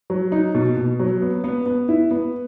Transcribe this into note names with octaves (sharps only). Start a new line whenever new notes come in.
F#3
D#4
B2
B2
F#3
B3
B3
B3
E4
B3